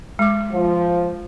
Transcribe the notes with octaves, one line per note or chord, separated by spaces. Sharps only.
G#3 D6
F3